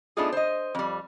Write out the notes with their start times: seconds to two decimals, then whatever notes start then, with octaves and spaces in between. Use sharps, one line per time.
0.17 A3 B3 D4 D#4 F4 G#4
0.32 C5 D#5
0.75 F2 G3